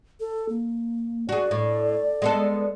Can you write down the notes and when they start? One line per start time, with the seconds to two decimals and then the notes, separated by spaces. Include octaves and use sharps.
0.20 A4
0.49 A#3
1.29 F#4 G#4 D5
1.51 A2
2.22 G#3 B3 A4